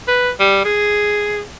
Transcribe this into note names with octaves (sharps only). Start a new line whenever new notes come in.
B4
G3
G#4